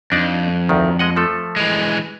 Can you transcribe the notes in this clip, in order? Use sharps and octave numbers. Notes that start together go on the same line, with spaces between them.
F2 D4 D#4 D5
D2 D#3
G#3 D#5 F#5
F3 A3 A4
E3 G#3